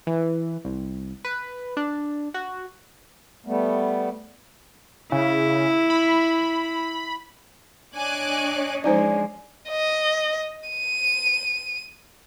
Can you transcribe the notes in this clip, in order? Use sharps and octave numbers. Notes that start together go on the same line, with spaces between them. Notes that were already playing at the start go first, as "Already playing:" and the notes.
E3
C2
B4
D4
F#4
G3 A3 B3
C#3 E4
B5
D4 C#5 D#5 G#5 D6 F#6
F3 G#3 C#4 D#4 C5 D5 G#5
D#5
D#7